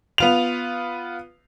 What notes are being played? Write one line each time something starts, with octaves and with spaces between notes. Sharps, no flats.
B3 F4 F7